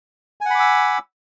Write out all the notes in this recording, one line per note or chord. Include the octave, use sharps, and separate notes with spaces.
F#5 G#5 B5 D6 E6